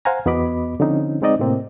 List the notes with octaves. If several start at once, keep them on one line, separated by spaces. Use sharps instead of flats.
C5 F5 F#5 G#5 A#5
E2 B3 F#4 D#5 B5 D6
D3 F3 C4 C#4 D#4
G#3 C4 D#4 D5 D#5
A2 C3 A#3 C4